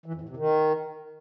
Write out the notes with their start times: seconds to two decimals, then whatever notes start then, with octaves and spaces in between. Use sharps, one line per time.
0.06 E3
0.13 F2
0.21 A2
0.29 C3
0.37 D#3